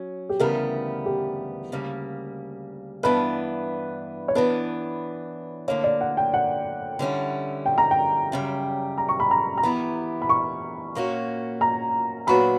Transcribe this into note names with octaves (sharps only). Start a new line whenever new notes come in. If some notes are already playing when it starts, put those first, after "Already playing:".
Already playing: F#3 C#4
G4
D2 C#3 E3 G3 B3 A#4
G4
D2 C#3 G3 A#3
G2 E3 B3 D4 B4
C#5
E3 B3 D4 B4
D2 D3 A#3 C#5
D5
F#5
G5
F#5
D3 G3 C#4 E4
G5
A#5
G5
F#2 C#3 G3
A#5
C#6
B5
A#5
A#5
E3 B3 E4 G4 B5
B5
C#6
A#2 A#3 C#4 F#4
A#5
A#2 F#3 B3 D4 F#4 B5